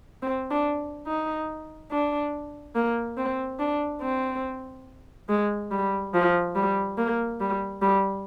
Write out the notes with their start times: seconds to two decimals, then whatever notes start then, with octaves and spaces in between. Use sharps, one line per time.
0.22 C4
0.51 D4
1.07 D#4
1.91 D4
2.75 A#3
3.17 C4
3.59 D4
4.02 C4
5.29 G#3
5.71 G3
6.14 F3
6.55 G3
6.98 A#3
7.40 G3
7.82 G3